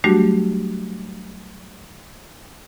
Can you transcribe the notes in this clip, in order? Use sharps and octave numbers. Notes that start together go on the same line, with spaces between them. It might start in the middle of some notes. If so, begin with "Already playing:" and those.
F#3 G3 A3 D4 F#4 G4